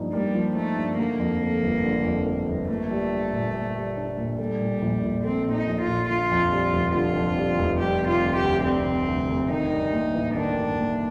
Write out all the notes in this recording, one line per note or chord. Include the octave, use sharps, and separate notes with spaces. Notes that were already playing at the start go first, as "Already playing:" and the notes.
Already playing: G2 F3 A#3 D#4
G3 A#3
F3
A3 D#4
G2
D3 A#3
F2
A3
G1
D3
F2
A3
G1
A3 A#3
G3
D4
A#2
A#3
G3
D4
A#2
G3 A3
A#2
A#1
A#1
A3 C4
A#2
D#4
A#1
F4
A#1
D3 F4
F2
G3
F1
D3 F4
F2
G3
F1
G3 G4
C3
F4
D2
G4
D2
G3 C4
C3
D2
D2
D#3 D#4
G2
A#3
A1
D#3 D4
G2
A#3